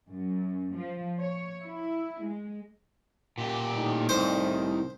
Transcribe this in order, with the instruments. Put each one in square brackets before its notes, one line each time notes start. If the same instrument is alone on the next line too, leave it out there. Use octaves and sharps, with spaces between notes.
[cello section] F#2
F3
C#5
E4
G#3
[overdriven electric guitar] A#2 G4
[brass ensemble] A2 D#3 D#4
[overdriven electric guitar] C2 [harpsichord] C5